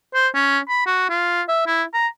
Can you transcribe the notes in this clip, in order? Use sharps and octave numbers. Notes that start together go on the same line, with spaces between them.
C5
C#4
B5
F#4
F4
E5
E4
A#5